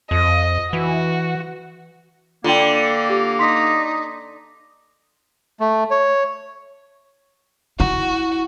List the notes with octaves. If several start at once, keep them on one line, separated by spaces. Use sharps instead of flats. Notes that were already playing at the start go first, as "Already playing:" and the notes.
F2 D#5
E3 F#4
D3 A#3 F4 D5 G5
G4
D#4 C6 B6
A3
C#5
E4 F#4